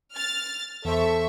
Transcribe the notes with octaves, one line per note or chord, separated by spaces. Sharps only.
F6 A6
E2 A4 C5 E5 C#6